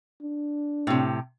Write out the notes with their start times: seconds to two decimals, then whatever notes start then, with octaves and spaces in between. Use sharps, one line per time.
0.22 D4
0.87 A2 C3